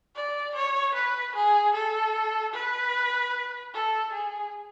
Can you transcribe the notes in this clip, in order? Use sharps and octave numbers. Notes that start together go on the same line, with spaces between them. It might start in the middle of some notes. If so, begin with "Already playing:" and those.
D5
C#5
B4
G#4
A4
B4
A4
G#4